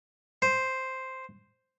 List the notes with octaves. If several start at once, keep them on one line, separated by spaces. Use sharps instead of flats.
C5